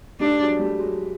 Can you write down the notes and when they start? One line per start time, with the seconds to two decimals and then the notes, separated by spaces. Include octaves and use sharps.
0.20 G3 A3 D4
0.39 F#3 G#3
0.59 G3 A3
0.79 F#3 G#3